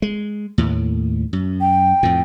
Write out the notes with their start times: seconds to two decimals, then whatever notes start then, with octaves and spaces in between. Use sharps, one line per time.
0.02 G#3
0.58 D#2 A2
1.33 F#2
1.61 G5
2.03 F2 A2